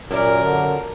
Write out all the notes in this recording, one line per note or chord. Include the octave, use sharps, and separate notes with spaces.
F#2 A#2 E4 G4 A#4 D5
D3